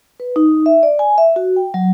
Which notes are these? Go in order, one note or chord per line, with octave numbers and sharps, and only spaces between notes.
B4
D#4
E5
D5
G#5
E5
F#4
G5
F#3